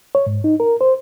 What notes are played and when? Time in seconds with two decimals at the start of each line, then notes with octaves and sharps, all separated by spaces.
0.15 C#5
0.27 G#2
0.44 D#4
0.60 A#4
0.81 C5